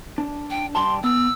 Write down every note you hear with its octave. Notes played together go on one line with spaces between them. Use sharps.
D4
G5
G2 G4 A5 C6
B3 E6